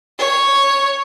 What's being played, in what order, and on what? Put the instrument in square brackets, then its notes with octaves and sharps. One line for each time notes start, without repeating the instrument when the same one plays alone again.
[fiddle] C#5